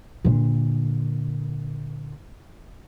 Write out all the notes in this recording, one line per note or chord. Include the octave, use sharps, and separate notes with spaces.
A#2 D3